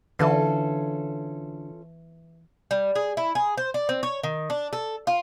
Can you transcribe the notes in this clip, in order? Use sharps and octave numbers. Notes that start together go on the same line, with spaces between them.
D3 E3 C#4 F4 A4 B4 E5
G3
G#4
E4
G#4
C5
D5
C4
C#5
D#3
D4
A4
F4